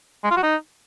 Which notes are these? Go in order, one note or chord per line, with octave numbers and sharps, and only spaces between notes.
G#3
F4
F#4
D#4